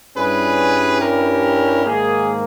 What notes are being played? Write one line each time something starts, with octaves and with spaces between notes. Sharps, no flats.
G2 G3 C#4 E4 G#4 B4
G4 A#4
G#2 D#3 A#3 G#4